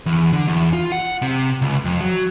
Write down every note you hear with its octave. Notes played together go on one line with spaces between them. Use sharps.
E2
D3
E2
F4
F#5
C3
C#2
F2
F#3